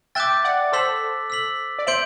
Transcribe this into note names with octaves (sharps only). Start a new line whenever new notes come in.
E5 G5 D6 F#6 A6
D5 F#5
A4 C5 E6 B6 F#7
E6 B6 F#7
D5
C5 E5 C6 G6 D7 F#7